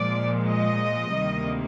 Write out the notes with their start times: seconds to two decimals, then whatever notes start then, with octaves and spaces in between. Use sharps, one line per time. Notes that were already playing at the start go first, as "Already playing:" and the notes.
Already playing: A#2 F3 G#3 D5
0.48 D#5
1.15 D2 C3 D#3 G3 A#3